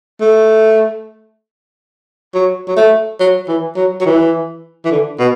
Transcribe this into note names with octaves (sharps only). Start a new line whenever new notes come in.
A3
F#3
F#3
A3
F#3
E3
F#3
F#3
E3
E3
D3
B2